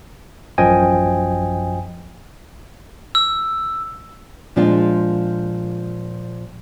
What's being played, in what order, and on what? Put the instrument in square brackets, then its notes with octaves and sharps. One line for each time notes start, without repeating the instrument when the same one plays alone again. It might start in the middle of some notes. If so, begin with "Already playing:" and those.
[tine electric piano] A1 F#2 F3 D#5 G5 G#5
[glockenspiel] E6
[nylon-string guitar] A#2 F3 G#3 D4 F4